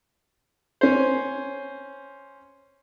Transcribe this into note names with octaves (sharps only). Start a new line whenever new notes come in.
C#4 C5